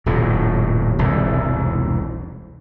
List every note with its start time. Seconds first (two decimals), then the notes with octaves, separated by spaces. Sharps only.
0.06 D#1 F#2 A2
0.99 E1 C2 G#2